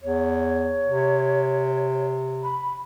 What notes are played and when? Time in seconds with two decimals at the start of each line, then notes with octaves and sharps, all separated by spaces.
0.02 E2 C#5
0.85 C3
2.43 B5